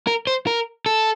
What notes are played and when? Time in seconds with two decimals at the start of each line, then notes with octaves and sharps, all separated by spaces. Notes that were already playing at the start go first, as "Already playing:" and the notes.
0.07 A#4
0.27 C5
0.47 A#4
0.86 A4